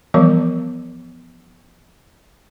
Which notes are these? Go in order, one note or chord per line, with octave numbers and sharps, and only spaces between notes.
E3 F3 G3 B3 A#4 C#5